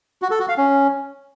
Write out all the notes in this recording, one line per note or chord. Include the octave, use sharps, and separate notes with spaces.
F#4
A4
F#4
F5
C#4